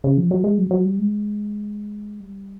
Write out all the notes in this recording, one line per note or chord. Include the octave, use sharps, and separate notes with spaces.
C#3
F3
F#3
G#3
F#3
F#3
G3
G#3
G3